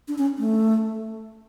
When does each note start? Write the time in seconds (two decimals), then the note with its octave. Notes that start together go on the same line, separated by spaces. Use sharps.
0.08 D4
0.18 C#4
0.39 A3